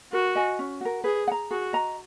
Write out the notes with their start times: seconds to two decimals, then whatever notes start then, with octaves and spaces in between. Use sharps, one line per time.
0.12 F#4 A#4
0.35 D#5 G#5
0.59 C#4
0.81 F#4 A#4
1.04 G#4 B4
1.28 F#5
1.32 A#5
1.51 F#4 G#4
1.73 D#5 A#5